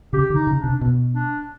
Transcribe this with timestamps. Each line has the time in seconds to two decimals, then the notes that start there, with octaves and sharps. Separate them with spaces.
0.13 C#3 G4
0.30 D3
0.35 D#4
0.47 C#3
0.58 D4
0.64 C3
0.81 B2
1.15 D4